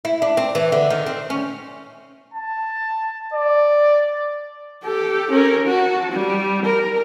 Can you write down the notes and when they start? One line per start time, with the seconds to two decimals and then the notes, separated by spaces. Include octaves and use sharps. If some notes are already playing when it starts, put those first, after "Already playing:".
0.05 E4
0.22 D4
0.37 C4
0.55 E3
0.72 D3
0.90 D#3
1.06 C4
1.30 C#4
2.34 A5
3.34 D5
4.85 G4 A4
5.32 C#4 A#4
5.67 F#4 A5
6.12 G3
6.66 A#4